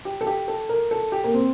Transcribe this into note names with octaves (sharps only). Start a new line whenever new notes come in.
G4
A4
G4
A4
A#4
A4
G4
A#3
C4